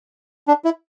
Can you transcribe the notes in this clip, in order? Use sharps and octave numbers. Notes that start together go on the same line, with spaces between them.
D4
E4